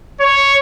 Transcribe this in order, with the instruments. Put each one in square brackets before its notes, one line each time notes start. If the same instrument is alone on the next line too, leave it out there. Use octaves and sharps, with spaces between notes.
[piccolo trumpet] C#5